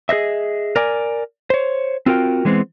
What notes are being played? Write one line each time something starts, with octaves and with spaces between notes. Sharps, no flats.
G#4 C5 D#5 E5
A#4 D5 G#5
C5 C#5
C4 F4 F#4 A#4 G5
E3 G#3 B3 C4